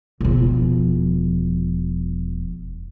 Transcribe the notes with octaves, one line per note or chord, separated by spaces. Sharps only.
E1 F3